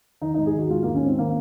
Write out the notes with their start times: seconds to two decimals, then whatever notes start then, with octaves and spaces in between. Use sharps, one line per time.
0.22 D#3 D#4
0.34 G#2 D#4
0.46 G#4
0.55 D#3 F#4
0.70 G#2 F4
0.83 D#3 A#3
0.95 C#4
1.02 G#2 C4
1.19 D#3 A#3